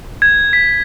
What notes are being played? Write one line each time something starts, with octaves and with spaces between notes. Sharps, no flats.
G#6
B6